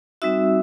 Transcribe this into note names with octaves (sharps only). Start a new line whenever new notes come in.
G3 C4 D#4 F#4 E5 E6